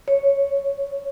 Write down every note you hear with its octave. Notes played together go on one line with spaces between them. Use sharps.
C#5